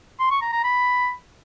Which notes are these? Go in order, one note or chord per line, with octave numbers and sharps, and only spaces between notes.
C6
C#6
A#5
A#5
B5